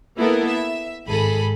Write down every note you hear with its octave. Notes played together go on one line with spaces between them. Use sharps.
A#3 B3 E4 A4 A#4
E5
G#1 G#4 A4 B5